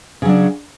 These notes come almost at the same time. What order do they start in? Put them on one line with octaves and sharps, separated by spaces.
C#3 F#3 D4